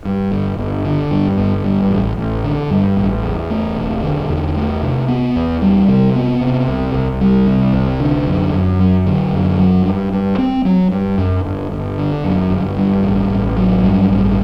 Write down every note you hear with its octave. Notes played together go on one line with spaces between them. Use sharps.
G2
G1
G1
D3
G2
G1
G2
A1
A1
D3
G2
A1
E2
A3
E1
D3
E2
A3
C3
B3
E2
G3
C3
B3
C3
C2
C2
G3
C3
C2
D3
F#2
F#2
F#3
D3
F#2
F#3
G2
G2
C4
F#3
G2
F#2
G1
G1
D3
F#2
G1
G2
A1
A1
F#3
G2
A1